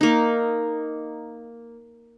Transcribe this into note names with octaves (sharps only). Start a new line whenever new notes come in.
A#3 D#4